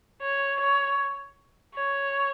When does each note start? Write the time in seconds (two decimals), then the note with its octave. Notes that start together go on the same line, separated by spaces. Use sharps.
0.21 C#5
0.60 C#5
1.75 C#5